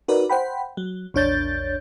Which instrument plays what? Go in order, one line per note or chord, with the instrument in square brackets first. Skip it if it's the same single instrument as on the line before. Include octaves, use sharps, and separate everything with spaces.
[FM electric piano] D#4 F#4 A#4 B4 D5
C5 F#5 G5 B5
F#3
A#1 E2 D4 C#5 G6 A6